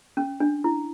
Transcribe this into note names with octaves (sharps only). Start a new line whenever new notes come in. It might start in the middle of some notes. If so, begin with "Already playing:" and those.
C#4
D4
E4